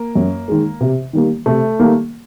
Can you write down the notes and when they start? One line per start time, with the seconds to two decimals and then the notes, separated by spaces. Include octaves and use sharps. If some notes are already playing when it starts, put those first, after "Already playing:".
Already playing: A#3
0.15 F#2
0.48 D#3 G#3
0.80 C3
1.13 D#3 G3 A#3
1.46 C3 A3
1.79 D#3 G3 A#3